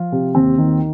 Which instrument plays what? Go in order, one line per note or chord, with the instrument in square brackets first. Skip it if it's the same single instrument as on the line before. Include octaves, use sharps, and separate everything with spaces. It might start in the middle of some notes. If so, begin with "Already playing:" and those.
Already playing: [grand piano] F3 F4
C3
D#2 C4
D#3